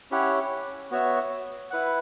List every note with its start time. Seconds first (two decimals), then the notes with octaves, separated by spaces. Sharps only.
0.11 C#4 E4 G4 C#5 F#5
0.91 B3 F#4 C#5 E5
1.71 E4 B4 F#5